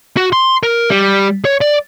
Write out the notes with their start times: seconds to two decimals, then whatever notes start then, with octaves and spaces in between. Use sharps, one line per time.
0.17 F#4
0.33 C6
0.63 A#4
0.90 G3
1.45 C#5
1.61 D5